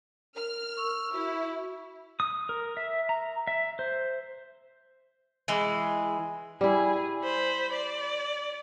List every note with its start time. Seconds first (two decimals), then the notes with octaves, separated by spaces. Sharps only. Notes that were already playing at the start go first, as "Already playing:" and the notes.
0.35 A#4 F6
0.77 C#6 E6
1.13 E4 F#4
2.20 D#6
2.49 A#4
2.77 E5
3.09 A#5
3.47 E5
3.79 C5
5.48 E3 G#3
6.61 G3 E4 G#4
7.22 C5 B5
7.72 D5